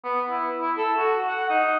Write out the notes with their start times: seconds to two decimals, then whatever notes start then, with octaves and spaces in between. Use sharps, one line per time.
0.04 B3
0.30 E4
0.61 E4
0.77 A4
0.98 F#4
1.28 F#5
1.50 D#4